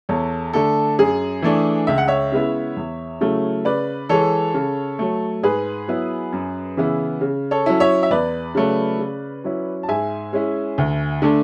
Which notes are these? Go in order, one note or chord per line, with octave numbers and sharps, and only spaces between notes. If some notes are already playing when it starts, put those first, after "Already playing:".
E2 A4 C#5
D3 A3 D4 A4
F#2 G#4
E3 A3 D4
C#2 E5
F#5
C#5 E5
C#3 G#3 B3 E4
E2
C#3 F#3 A3 E4
C#3 B4 D5
E3 G#3 A4 C#5
C#3
F#3 A3
G#2 G#4 B4
F#3 B3 E4
F#2
C#3 E3 B3 E4
C#3
A4 C#5
F#3 C#4 E4
C#5 E5
E5
E2 B4 D5
C#3 F#3 A3
C#3
F#3 C#4 E4
A5
G#2 E5 G#5
G#3 C#4 E4
D2
D3 A3 D4